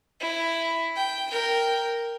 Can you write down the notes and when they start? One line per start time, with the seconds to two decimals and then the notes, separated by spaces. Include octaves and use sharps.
0.20 E4
0.96 G5
1.31 A#4 G5